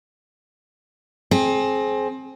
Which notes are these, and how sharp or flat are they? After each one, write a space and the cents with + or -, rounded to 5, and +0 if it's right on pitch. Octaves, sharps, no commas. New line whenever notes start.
C4 +20 G#4 +35